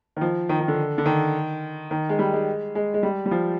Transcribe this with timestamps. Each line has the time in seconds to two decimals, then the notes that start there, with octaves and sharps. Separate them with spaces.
0.17 D#3
0.21 F3
0.49 D#3
0.60 D#3
0.68 D3
0.98 D3
1.06 D#3
1.91 D#3
2.09 G#3
2.19 G3
2.33 G#3
2.75 G#3
2.94 G#3
3.03 G3
3.26 G3
3.31 F3